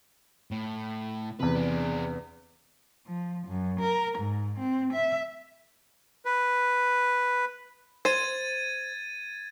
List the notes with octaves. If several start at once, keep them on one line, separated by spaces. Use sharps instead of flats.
A2
E2 C3 B4
D4 G#4
F3
F#2
A#4
G#2
C4
E5
B4
C5 G#6 A6 D#7